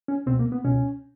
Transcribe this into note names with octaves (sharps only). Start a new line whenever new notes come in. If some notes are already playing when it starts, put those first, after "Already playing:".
C#4
C#2 B2 C4
A#3
B3
C#2 B2 C#4